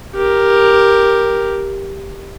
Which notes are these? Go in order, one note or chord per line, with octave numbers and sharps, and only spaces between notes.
G4 A#4